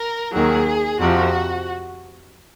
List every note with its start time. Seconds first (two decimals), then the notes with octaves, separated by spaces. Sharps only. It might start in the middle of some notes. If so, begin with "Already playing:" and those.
Already playing: A#4
0.33 D#2 D#3 F#3 G#4
0.99 F2 C3 F3 F#4